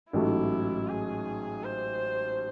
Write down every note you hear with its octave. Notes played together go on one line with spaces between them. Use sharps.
A1 G#2 F#3 A3 E4
G#4
C5